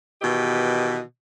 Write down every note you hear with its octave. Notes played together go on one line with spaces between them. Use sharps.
B2 D#3 E3 G4 D#5